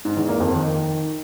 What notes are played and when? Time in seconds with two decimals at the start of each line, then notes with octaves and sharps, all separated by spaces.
0.05 G#2
0.17 E2
0.28 A#3
0.40 F2
0.52 D#3